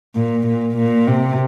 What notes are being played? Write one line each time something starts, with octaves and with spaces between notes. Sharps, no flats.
A#2
A#2
A#2
C3